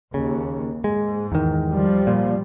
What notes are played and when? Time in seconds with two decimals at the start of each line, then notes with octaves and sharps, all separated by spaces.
0.14 D#2 C#3
0.84 G#2 G#3
1.32 E2 D#3
1.70 F3 G3
2.07 A#2